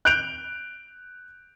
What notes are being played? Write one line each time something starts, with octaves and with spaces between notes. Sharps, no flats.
F#6 G6 D7 F7